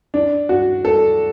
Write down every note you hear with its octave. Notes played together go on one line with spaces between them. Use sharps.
D4
F#4
A4